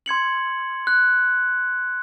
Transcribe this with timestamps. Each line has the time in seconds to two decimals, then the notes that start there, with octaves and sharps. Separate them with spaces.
0.06 C6 G#6 C#7 F#7
0.87 F#6